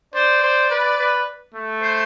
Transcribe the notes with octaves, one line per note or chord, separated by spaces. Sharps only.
C5 D5
C5
B4
B4
A3
C5